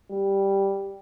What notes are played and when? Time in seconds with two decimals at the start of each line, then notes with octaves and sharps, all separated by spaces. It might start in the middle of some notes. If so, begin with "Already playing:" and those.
0.11 G3